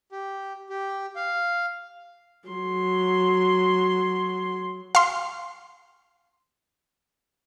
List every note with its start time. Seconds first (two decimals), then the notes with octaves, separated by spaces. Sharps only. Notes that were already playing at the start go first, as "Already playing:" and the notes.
0.12 G4
0.70 G4
1.16 F5
2.49 F#3 C6
4.95 F5 C6